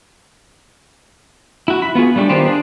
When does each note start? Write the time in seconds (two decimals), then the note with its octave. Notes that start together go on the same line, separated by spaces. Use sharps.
1.68 E4 F#4
1.82 B5
1.95 B3 F4 F#4 G#4
2.16 G3 A3 D4 G4
2.29 D#3 B3 F4 G4 C5
2.48 D4 G#4